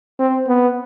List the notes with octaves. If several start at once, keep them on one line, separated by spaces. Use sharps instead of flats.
C4
B3